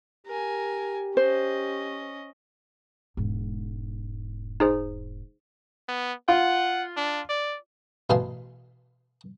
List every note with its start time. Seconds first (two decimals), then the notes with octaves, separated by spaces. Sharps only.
0.26 G4 A#4 G#5
1.17 C#4 C5 D#5
3.17 E1 G#2
4.60 D#4 G#4 C5
5.89 B3
6.28 F4 F#5
6.97 D4
7.29 D5
8.10 A1 B2 A3 F5 G#5 C6